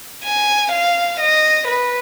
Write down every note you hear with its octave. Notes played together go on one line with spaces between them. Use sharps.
G#5
F5
D#5
B4